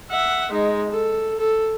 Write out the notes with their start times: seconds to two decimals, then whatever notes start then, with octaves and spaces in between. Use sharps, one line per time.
0.11 E5 F#5
0.51 G#3 D#4
0.90 A4
1.39 A4